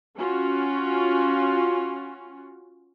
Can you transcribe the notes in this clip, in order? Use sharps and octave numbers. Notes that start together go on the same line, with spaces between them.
C#4 F4 F#4